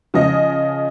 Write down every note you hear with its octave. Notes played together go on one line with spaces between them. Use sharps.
C#3 F3 D#5